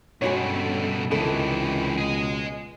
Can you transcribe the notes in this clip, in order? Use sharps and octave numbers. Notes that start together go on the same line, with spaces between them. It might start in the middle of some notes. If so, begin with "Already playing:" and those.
G2 B2 G3 G#3 C#4 F#4 A4 C#5
C#2 C3 D#3 E3 A4
B2 G#4 D#5